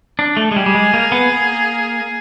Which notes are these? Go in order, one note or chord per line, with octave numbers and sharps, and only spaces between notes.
D4
A3
G#3
G3 G#4
G3
G#3
A#3
B3
A#3